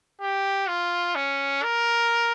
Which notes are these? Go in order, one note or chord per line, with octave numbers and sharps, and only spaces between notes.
G4
F4
C#4
A#4